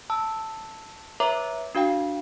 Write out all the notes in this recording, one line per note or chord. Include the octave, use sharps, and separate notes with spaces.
A5 E6
B4 C#5 E5 A#5 D6
D4 F#4 F5 G5